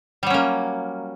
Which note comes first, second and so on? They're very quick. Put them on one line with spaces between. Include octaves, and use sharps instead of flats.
G3 F#3 C#4 A#3